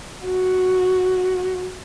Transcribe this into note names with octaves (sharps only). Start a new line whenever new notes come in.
F#4